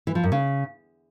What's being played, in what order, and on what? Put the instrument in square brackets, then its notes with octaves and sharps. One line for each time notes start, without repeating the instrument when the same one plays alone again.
[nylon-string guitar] E3
F3
F#2
C#3